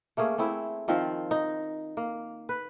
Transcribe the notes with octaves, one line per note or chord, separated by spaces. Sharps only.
A3 A#3 C#4 G#4
A3 C4 E4 G#4
D#3 F3 C4 F4
D#4
A#3
B4